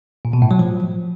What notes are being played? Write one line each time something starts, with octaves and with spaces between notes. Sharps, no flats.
A#2
B2
A2
F#3
F3